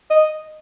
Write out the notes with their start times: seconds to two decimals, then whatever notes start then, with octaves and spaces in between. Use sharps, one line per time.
0.10 D#5